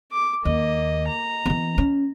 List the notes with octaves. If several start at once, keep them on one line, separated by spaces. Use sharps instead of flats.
D6
D#2 A#3 D#5
A#5
E3 B3
C#4